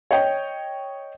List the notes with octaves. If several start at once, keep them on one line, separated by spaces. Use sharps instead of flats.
C#5 D#5 G5